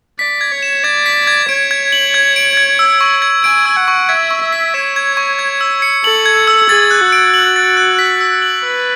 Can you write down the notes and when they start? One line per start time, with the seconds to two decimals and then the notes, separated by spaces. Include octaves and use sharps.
0.19 D5 B6
0.41 G#6
0.51 C#5
0.63 E7
0.84 D5 G#6
1.06 B6
1.27 G#6
1.49 C#5 D7
1.71 G#6
1.92 F#7
2.14 G#6
2.36 D7
2.57 G#6
2.79 E6
3.01 C#6
3.22 G#6
3.44 G#5 D7
3.66 E6
3.76 F#5
3.88 C#6
4.09 E5 G#6
4.31 C#6
4.41 E5
4.52 B6
4.74 C#5 E7
4.96 G#6
5.17 C#6
5.39 G#6
5.61 E6
5.82 C#7
6.04 A4 F#7
6.26 G#6
6.47 E6
6.69 G#4 A6
6.91 F#6
7.01 F#4
7.12 D7
7.34 F#7
7.56 A6
7.77 F#6
7.99 B6
8.20 E6
8.42 F#7
8.64 B4 E6